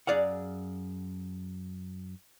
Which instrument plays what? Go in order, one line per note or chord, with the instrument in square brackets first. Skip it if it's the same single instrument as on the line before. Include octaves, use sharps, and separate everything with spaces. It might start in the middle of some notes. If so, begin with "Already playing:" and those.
[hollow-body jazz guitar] F#2 G#4 D5 F5 F#5